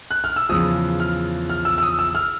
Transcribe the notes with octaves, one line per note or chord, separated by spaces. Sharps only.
F#6
F6
E6
E2 C#3 F3 D#6
F6
F6
E6
E6
D#6
E6
F6